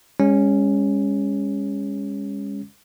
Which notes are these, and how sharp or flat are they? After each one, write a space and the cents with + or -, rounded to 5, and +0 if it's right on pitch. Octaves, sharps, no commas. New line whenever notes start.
G#3 -35 C#4 +0